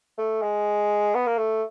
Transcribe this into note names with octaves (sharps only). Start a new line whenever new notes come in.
A3
G#3
B3
A#3
A3